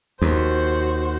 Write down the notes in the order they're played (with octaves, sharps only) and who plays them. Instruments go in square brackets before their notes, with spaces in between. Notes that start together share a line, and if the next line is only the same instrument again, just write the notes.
[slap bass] D#2 [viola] F#4 C5